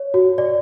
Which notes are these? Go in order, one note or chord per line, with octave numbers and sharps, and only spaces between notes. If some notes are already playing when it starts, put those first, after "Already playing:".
Already playing: C#5
F#4
D5